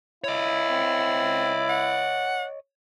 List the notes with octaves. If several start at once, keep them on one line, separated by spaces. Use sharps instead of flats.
E4 C#5 D#5
C4
F#5